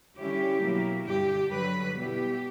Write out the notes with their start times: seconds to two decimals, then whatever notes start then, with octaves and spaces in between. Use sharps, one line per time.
0.18 D3 G3 C#4 E4 G4
0.63 B2 F#3 A#3 E4
1.07 G2 D3 G3 G4
1.51 G2 D3 F#3 B4
1.96 B2 G3 B3 E4 G4